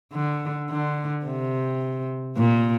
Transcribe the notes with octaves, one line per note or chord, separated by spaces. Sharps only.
D3
D3
C3
A#2